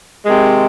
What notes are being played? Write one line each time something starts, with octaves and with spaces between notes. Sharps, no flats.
C3 D#3 G#3